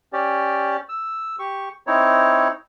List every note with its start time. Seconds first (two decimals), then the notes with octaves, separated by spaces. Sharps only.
0.13 C#4 G4 D5
0.89 E6
1.39 G4 C#6
1.87 C4 D#4 E4 C#5